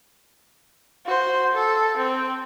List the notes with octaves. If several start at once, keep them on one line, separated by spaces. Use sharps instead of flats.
F#4 C5
A4
C4 G5